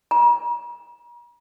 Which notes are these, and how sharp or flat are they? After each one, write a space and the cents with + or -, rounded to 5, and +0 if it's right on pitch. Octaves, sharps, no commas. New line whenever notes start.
A#5 +45